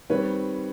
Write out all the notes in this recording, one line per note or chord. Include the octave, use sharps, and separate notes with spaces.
D#3 G3 C4 B4 C#5